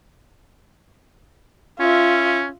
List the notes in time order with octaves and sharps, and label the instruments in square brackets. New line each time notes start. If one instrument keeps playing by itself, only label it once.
[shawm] C#4 [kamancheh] F4 E5